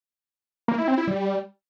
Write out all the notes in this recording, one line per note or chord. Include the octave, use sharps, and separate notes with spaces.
A#3
E4
C4
E4
G3